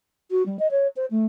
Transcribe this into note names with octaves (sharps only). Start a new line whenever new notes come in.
F#4
G3
D#5
C#5
C5
A3